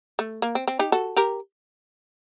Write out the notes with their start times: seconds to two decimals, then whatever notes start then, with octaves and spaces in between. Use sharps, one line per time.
0.19 A3
0.42 A#3
0.55 C4
0.68 C4
0.79 D#4 G4
0.92 F#4 A4
1.16 G4 A#4